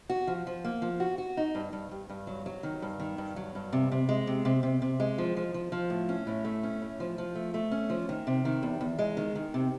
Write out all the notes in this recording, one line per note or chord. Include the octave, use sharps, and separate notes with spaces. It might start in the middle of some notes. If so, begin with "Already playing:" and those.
F#4
F3
F3
A#3
F3
F#4
F#4
D#4
G2
G2
G2
G2
F#3
F#3
D#3
G2
D#3
G2
F#3
G2
C3
C3
G#3
C3
C3
C3
C3
G#3
F3
F3
F3
F3
A2
C#4
A2
A3
C#4
A2
F3
F3
A3
A3
C#4
F3
D#3
C3
D#3
E2
E2
G#3
D#3
D#3
C3